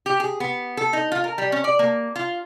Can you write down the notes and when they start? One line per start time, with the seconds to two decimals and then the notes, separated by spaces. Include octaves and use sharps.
0.06 G4
0.20 G#4
0.40 B3
0.77 A4
0.93 D#4
1.12 F4
1.24 A#4
1.38 G3
1.52 C#4
1.64 D5
1.79 A#3
2.16 F4